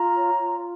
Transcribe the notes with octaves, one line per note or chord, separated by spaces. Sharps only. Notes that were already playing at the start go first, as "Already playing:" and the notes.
Already playing: F4 A#5
C#5
F4